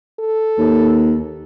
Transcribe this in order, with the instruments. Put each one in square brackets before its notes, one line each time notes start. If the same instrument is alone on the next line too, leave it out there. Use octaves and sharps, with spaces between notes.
[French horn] A4
[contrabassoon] D#2